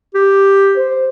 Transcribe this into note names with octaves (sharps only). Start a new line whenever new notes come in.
G4
C5